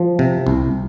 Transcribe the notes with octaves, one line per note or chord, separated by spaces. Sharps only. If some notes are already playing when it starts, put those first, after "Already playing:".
Already playing: F3
C3
C2